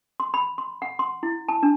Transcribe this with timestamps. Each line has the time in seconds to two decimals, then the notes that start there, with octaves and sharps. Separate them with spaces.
0.20 C6
0.34 B5
0.58 C6
0.82 F#5
0.99 C6
1.23 E4
1.49 A5
1.63 D4